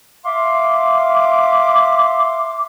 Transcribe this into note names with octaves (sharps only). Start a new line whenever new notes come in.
E5 F5 C6 D6